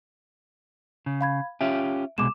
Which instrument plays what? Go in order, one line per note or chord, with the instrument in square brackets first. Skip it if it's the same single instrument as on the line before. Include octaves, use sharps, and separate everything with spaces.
[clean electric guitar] C#3
[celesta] F5 B5 G#6
[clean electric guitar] C#4 F4 G4 [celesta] E5
[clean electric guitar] C2 B2 G#3 [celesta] D6 E7